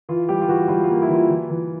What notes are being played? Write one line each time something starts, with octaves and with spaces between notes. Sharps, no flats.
E3 F4
G3 G4
F4
E3 F#4
G3 F4
F4
A#3
E4
E3 F4
E3
E3